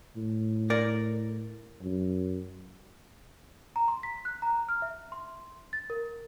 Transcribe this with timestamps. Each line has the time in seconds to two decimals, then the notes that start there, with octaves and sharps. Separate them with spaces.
0.16 A2
0.70 A#4 D5
1.81 F#2
3.76 A#5
3.88 C6
4.03 B6
4.25 F#6
4.42 A#5
4.69 F6
4.82 E5
5.12 C6
5.73 A6
5.90 A#4